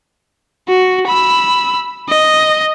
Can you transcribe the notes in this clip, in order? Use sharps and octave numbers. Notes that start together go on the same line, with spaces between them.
F#4
B5 E6
D#5